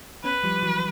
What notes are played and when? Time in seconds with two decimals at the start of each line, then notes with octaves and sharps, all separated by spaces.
0.24 B3 C#4 B4
0.44 F3 G3
0.63 E3 F#3